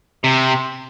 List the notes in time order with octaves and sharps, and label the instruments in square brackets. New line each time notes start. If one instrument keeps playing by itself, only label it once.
[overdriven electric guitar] C3